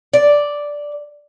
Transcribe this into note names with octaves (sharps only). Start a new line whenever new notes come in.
D5